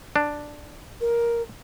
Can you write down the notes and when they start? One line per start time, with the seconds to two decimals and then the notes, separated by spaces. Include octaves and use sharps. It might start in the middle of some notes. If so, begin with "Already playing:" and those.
0.16 D4
1.01 A#4